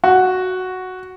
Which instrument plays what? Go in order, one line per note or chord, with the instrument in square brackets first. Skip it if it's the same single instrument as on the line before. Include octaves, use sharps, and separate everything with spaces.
[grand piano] F#4